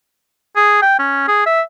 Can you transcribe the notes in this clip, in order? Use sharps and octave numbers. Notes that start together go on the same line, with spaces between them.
G#4
G5
C#4
G#4
E5